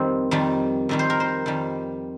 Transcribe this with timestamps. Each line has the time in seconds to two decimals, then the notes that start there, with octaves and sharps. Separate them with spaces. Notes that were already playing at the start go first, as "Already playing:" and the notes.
Already playing: F2 D#3 G3 C4
0.31 F2 D#3 G3
0.89 F2 D#3 G3
0.99 C5
1.10 A#4
1.20 C5
1.46 F2 D#3 G3